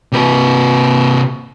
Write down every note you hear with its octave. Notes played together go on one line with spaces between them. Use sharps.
C3 B4